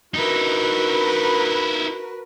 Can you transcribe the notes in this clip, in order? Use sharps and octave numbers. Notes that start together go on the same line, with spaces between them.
D#4 E4 F#4 A#4 B4